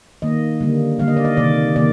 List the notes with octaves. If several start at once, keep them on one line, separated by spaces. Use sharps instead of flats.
D#3 A#3 D#5
D3 G3 A#3
D3 G3 A#3 F5
D#5
D5
D#5
C3 D#3 A#3 D5
C3 D#3 A#3 D5